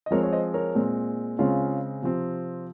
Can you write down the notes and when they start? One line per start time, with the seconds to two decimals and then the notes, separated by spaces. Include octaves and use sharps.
0.06 D#5
0.11 F3 G#3 C4 A#4 C#5
0.23 C#5
0.33 C5 D#5
0.54 A#4 C#5
0.75 A#2 G#3 C4
1.39 C#3 G#3 C4 C#4 F4
2.02 C3 F3 C4